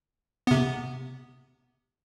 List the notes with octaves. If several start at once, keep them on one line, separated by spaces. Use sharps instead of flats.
C3 B3